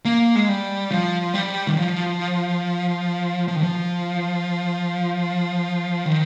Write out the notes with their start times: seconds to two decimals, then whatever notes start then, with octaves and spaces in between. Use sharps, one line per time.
0.05 A#3
0.36 G#3
0.48 G3
0.91 F3
1.34 G3
1.67 D#3
1.77 F3
3.48 F3
3.55 D#3
3.63 F3
6.05 D#3